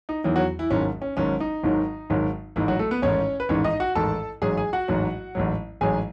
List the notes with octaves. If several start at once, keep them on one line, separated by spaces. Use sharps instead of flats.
D#4
E2 D#3 E3 F#3 E4
F#3 F#4
E3 E4
G#1 G#2 D#3 F#3 C#4
C#4
G#1 G#2 D#3 F#3 C#4
D#4
G#1 G#2 D#3 F#3
G#1 G#2 D#3 F#3
A1 G#2 D#3 E3 E4
F#3 F#4
A3 A4
B3 B4
A1 G#2 D#3 C#4 C#5
B4
A1 G#2 D#3 C#4 C#5
D#4 D#5
F#4 F#5
A1 G#2 D#3 A4 A5
A1 G#2 F#3 G#4 G#5
G#4 G#5
F#4 F#5
A1 G#2 F#3
A1 G#2 F#3
A1 G#2 F#3 G#4 G#5